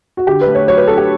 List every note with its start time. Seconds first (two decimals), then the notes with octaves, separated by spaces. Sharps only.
0.17 F#4
0.27 D3 G4
0.41 B4
0.47 A3
0.55 C#5
0.68 F#3 C#5
0.77 B4
0.87 D4 A4
0.97 G4